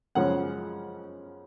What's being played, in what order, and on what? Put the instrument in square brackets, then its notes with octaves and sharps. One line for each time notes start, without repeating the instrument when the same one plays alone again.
[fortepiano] F#2 C#3 F3 G#3 C#4 F#5